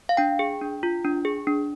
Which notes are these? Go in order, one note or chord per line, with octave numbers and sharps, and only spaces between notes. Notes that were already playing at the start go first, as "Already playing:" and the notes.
F5
D4 G5
G#4
D4
F4
D4
G#4
D4